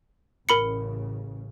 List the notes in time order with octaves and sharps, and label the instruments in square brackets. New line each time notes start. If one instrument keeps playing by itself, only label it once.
[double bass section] A1 C#3 [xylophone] A#4 B5 C#7